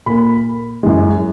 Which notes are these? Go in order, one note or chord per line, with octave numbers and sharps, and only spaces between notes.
A#2 A#3 B5
F#2 E3 G#3